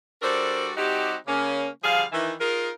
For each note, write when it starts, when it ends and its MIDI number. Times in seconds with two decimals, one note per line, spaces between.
0.22 0.71 55
0.22 0.71 62
0.22 0.71 66
0.22 0.71 69
0.22 0.71 70
0.22 0.71 72
0.77 1.15 55
0.77 1.15 60
0.77 1.15 63
0.77 1.15 66
0.77 1.15 67
1.27 1.66 49
1.27 1.66 58
1.27 1.66 61
1.84 2.04 50
1.84 2.04 53
1.84 2.04 55
1.84 2.04 68
1.84 2.04 77
2.12 2.34 51
2.12 2.34 52
2.39 2.70 63
2.39 2.70 65
2.39 2.70 68
2.39 2.70 70